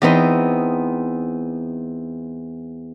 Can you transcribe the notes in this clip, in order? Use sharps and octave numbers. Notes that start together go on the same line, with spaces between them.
E2 B3 C4 D#4 C6